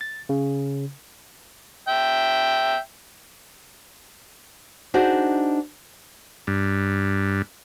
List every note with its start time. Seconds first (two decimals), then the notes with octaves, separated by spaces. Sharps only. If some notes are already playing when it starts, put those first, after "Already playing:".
0.01 A6
0.29 C#3
1.88 E5 G5
4.94 D4 D#4 F#4 G#4 C5 D5
6.47 G2